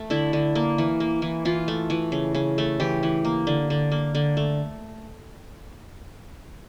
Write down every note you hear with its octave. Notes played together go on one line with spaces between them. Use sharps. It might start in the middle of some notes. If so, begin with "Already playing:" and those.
Already playing: A3
D3 E4
D3
A#3
E3
A#3
E3
E3 F4
A3
E3
C#3
C#3
A3
E3 G4
E3
A#3
D3
D3
A#3
D3
A3